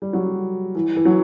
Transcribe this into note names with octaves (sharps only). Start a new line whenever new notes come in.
G3
F#3
E3
E3
F#3